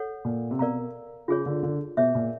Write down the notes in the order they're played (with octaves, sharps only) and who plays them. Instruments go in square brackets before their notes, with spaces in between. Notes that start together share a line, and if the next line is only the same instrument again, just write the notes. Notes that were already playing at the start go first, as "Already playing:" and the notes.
Already playing: [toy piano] A4 C#5 F#5
[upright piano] A#2
C3
[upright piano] B2 [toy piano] A#4 D5 F5 A#5
[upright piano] C#3 [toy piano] F4 G#4 C#5
[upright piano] D3
D3
[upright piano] B2 [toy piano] G#4 C#5 E5
[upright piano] A#2